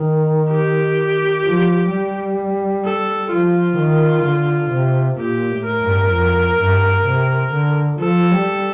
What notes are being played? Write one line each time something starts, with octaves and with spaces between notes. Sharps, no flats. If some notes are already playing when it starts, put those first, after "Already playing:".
Already playing: D#3
G4
F3
G3
A4
F3 F4
D#3
D3
C3
A#2 G4
A2
A#4
G2
F2
G2
C3
D3
F3 A4
G3